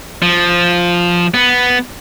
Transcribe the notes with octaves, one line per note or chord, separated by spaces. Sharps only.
F3
B3